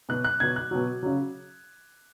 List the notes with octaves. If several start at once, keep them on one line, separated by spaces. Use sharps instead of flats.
B2 F#3 F#6
F#6
B2 F#3 G#6
F#6
B2 F#3
C#3 F#3